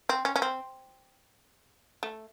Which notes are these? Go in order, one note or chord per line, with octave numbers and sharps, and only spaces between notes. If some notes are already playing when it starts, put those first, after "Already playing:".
C4
C#4
C#4
C4
A3